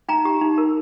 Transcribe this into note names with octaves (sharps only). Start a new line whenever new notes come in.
D#4 G5 A#5
G4
D#4
A#4